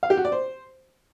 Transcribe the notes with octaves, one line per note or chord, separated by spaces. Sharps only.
F5
G4
F#4
D5
C5